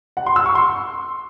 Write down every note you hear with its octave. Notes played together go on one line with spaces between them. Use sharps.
F#5
C6
E6
C#6
C6